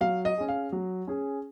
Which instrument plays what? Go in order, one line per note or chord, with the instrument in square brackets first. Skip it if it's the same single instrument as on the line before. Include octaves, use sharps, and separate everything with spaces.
[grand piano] F#3 [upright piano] F5
[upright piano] D#5
[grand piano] C#4 G#4
[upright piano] F5
[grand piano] F#3
C#4 G#4